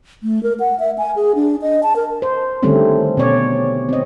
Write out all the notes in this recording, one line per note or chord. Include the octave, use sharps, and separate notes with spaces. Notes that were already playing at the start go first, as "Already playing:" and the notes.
A3
A#4
F#5
E5
G#5
G#4
D4
D#5
A5
A#4
C5
D3 D#3 G3 A3 C4 C#4
B2 C#4 C#5 D5
C4 D#5